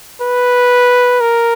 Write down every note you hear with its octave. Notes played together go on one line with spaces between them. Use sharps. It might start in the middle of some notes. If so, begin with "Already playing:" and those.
B4
A#4